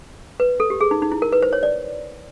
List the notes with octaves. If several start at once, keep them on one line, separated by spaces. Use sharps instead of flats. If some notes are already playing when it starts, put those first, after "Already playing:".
B4
A4
G4
G#4
D#4
D#4
E4
A#4
B4
C5
C#5
D5